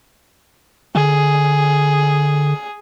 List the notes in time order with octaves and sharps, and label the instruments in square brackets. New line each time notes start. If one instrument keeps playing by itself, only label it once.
[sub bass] D3 [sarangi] G#4